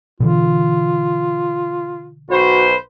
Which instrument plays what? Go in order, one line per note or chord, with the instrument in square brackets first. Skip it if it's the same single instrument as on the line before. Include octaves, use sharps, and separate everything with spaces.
[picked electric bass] B2 D3 E3 [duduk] F4
[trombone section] B1 B4 C5 [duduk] F#4